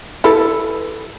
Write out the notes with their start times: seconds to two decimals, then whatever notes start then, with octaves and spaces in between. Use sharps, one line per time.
0.24 E4 A4 B4